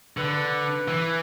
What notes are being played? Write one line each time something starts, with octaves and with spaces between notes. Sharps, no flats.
D3 B4
E3